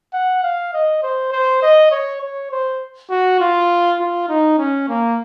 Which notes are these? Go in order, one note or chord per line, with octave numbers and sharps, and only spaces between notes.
F#5
F5
D#5
C5
C5
D#5
C#5
C#5
C5
F#4
F4
F4
D#4
C#4
A#3